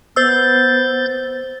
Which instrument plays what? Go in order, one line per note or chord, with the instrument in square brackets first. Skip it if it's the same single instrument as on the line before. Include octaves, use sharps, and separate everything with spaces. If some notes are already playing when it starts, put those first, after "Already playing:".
[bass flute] B3 [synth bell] C5 E6 [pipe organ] G6 A6